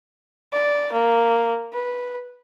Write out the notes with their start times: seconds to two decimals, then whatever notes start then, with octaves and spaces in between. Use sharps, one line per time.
0.53 D5
0.92 A#3
1.73 B4